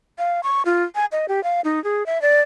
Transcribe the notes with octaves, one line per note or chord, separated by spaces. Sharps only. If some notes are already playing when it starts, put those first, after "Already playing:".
F5
C#6
F4
G#5
D#5
G4
F5
D#4
G#4
E5
D5